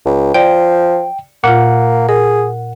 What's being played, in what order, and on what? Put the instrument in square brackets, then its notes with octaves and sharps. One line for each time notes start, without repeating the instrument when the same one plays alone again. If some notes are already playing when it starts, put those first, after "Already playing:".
[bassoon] C#2
[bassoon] F3 [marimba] D5 [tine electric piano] G5
[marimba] A#2 F4 [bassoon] A#3 [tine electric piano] F#5
[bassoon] G#4 [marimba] A#4